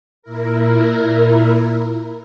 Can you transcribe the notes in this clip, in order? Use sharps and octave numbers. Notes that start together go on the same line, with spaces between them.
A#2 E4 A#4